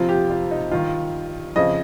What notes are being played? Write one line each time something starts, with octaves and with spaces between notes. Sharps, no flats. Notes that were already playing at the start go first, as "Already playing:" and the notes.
Already playing: F2 C3 F3 F4
G4
F4
D#4
G2 D#3 F4
F2 C#3 F3 D#5